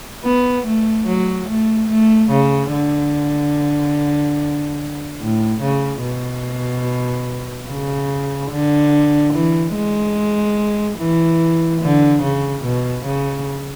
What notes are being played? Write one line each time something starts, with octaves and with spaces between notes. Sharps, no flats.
B3
A3
F#3
A3
A3
C#3
D3
A2
C#3
B2
C#3
D3
E3
G#3
E3
D3
C#3
B2
C#3